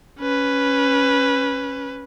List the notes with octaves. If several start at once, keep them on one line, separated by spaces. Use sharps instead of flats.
C#4 B4